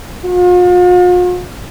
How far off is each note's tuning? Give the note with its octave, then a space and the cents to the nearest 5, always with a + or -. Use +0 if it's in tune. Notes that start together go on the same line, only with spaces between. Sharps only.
F4 +45